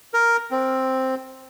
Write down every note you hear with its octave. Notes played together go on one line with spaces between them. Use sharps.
A#4
C4